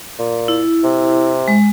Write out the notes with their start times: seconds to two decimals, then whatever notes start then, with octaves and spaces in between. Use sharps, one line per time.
0.19 A#2
0.48 E4
0.84 C3
1.48 G#3